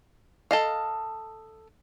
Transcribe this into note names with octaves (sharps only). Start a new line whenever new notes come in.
A4 D#5 F5